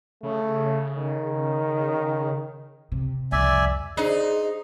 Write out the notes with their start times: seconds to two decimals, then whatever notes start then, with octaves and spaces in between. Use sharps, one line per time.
0.23 C#3 A3
0.94 D#3
2.92 C3
3.32 C2 F2 D5 E5 G#5
3.97 D4 D#4 G#4 C5 D5